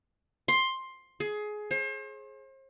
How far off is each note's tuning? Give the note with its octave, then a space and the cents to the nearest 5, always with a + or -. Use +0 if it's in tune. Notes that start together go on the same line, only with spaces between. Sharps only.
C6 +10
G#4 +20
C5 +40